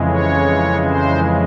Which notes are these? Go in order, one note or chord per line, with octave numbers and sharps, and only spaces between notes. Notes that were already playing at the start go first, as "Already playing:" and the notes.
Already playing: F2 C#3 E3 G#3
C#5
C5